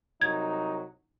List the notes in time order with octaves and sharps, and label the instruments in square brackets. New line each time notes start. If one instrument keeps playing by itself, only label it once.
[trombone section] C2 F#3 D#4 [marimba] G#6